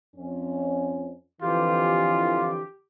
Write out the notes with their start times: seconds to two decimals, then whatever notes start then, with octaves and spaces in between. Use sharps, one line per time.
0.16 F2 C#4
1.42 F2 D3 E3 F4 G4